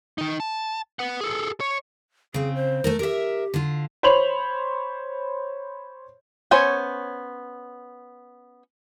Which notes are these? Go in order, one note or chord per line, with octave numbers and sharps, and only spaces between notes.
D#3 D#4
A5
B4 F#5
G#4 A4
C#5
C#3 C4 G#4
C5
A3 A4 A#4
G4 A#4 E5
D3 F4
C5 C#5 B5 F7 F#7
B3 C#4 C5 C#5 G#5